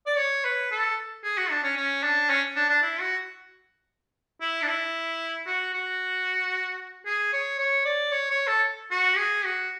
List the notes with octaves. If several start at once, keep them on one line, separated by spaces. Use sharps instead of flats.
D5
C#5
B4
A4
G#4
F#4
D4
C#4
C#4
D4
C#4
D4
D4
E4
F#4
E4
D4
E4
F#4
F#4
G#4
C#5
C#5
D5
C#5
C#5
A4
F#4
G#4
F#4